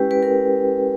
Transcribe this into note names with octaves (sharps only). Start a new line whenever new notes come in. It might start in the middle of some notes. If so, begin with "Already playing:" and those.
Already playing: G#3 C#4 E4 G4 B4 G5
B4
A#4